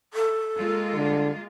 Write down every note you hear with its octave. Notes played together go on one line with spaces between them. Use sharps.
A4
G#3 A#3 F4
D3